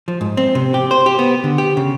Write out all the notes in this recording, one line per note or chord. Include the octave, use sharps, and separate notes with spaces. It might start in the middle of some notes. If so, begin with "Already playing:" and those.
F3
G#2
C4
C3
G4
C5
G4
B3
D3
G4
C#3